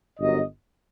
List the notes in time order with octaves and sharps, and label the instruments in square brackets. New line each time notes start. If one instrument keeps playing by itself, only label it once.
[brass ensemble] G1 F#2 F#3 D#5